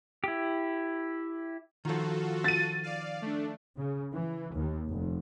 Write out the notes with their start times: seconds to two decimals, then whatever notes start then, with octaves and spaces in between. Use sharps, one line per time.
0.24 E4 G4
1.85 D#3 F3 F4 F#4 A4
2.44 A6 D#7
2.83 D5 F5
3.22 A3 D4
3.76 C#3
4.13 E3
4.54 D#2
4.89 F1